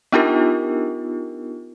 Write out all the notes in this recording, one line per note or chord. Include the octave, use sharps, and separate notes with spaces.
B3 D4 D#4 F4 G4 A#4